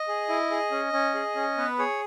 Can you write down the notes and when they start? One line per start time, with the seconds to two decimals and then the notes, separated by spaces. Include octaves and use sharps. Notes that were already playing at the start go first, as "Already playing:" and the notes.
Already playing: D#5
0.08 G#4
0.29 E4
0.51 G#4
0.71 C#4
0.93 C#4
1.15 G#4
1.35 C#4
1.57 B3 B4
1.79 G#4 C#5